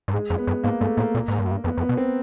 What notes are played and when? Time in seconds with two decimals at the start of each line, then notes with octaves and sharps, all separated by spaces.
0.08 G2
0.13 G#2 G#3
0.30 F2
0.38 B3
0.47 F#2
0.63 G#2 A#3
0.80 G2 A3
0.97 A2 A#3
1.15 A#2 A#3
1.28 G#2
1.39 G2
1.47 F#2
1.51 G2
1.64 F2 B3
1.78 F2
1.81 B3
1.89 B2
1.97 C4